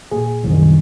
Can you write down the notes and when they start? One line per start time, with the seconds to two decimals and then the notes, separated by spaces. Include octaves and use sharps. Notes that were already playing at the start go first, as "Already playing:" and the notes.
0.11 A#2 G#4
0.43 C2 F#2 D#3